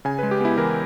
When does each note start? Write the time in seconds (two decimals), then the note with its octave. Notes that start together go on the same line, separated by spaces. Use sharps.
0.05 C#3 G#5
0.19 B4
0.23 G#3
0.31 G4
0.41 B3 E4
0.58 E3 A#4